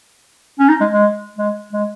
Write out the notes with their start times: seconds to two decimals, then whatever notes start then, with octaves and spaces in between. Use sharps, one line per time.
0.59 C#4
0.69 D#4
0.80 G#3
0.92 G#3
1.38 G#3
1.73 G#3